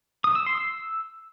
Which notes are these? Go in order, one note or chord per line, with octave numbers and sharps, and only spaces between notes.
D#6
E6
C6
E6